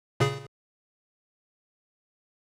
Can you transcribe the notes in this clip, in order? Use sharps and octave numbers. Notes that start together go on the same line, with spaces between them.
A#2 C#3 G#4